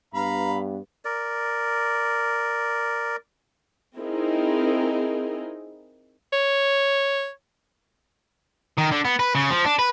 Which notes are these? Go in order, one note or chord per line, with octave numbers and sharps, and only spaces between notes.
G2 B3 F5 A#5 B5
A#4 D5
C4 D#4 E4 G#4 A#4
C#5
D#3
D3
B3
B4
C#3
F3
D4
B4